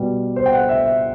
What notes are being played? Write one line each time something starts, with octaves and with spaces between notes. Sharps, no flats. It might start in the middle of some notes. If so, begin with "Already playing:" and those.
Already playing: B2 G3
C5
G5
F#5
E5
E5